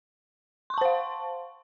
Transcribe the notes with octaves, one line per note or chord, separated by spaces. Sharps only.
C5 F5 A5 C6 C#6